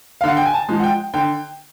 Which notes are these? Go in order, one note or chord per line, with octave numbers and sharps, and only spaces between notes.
D3 F5
F#5
G5
G#5
A5
F3 G#3
F#5
G5
D3 G5